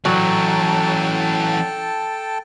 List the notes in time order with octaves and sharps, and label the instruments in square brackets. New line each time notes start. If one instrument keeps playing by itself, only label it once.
[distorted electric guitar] E3 C#4 [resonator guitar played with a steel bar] F#3 [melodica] A4 G5 A5